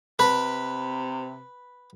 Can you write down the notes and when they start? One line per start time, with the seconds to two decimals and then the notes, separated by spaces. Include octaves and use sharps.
0.19 C3 B4